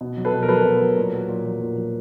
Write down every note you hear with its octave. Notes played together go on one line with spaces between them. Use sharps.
B2
F#3
A4 B4
B2
A#4
F#3 A4 B4
B2
F#3
A#2
F#3
A#2
F#3
A#2
F#3